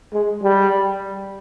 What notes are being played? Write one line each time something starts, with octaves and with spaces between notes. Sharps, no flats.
G#3
G3